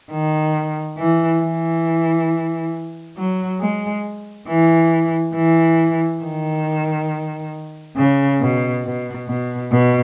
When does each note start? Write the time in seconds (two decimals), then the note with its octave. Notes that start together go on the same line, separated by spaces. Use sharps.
0.11 D#3
0.98 E3
1.42 E3
3.17 F#3
3.60 G#3
4.48 E3
5.35 E3
6.23 D#3
7.97 C#3
8.41 B2
8.85 B2
9.28 B2
9.72 B2